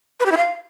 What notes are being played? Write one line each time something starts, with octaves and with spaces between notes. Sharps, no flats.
B4
G4
E4
F5